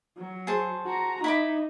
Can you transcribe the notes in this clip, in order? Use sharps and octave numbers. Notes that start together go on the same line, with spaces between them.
F#3
G#4 C5 A5
F#4 A#5
D#4 E4 B5 D6